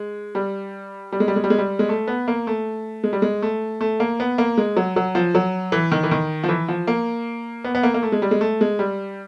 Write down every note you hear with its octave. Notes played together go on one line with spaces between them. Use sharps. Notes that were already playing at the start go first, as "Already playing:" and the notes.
Already playing: G#3
G3
G3
G#3
G3
G#3
G3
G#3
G3
G#3
A3
B3
A#3
A3
G#3
G3
G#3
A3
A3
A#3
B3
A#3
G#3
F#3
F#3
F3
F#3
E3
D#3
E3
D#3
F3
E3
F3
A#3
B3
B3
A#3
A#3
A3
G#3
G3
G#3
A3
G#3
G3